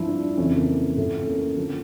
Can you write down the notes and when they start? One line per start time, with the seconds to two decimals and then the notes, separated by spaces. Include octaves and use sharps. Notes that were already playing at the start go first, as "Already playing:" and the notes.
Already playing: G2 F3 E4
0.08 D4
0.23 D4
0.37 F2 C#3 E3 C#4
0.57 A#3
0.98 A2 F3 A3
1.22 C#4
1.27 A#3
1.57 D3 F3 A#3